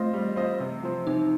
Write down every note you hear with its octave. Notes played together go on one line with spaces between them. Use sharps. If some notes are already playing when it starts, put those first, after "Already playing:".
Already playing: A3 C4 F4 C5 D#5
G3
C4 F4 C5 D#5
C3
F3 C4
C3 D#4